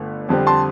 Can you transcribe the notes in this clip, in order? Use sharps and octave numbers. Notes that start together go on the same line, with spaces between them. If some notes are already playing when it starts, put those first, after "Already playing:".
Already playing: G1 D3 A3
F2 D3 G3 C4
A5 C6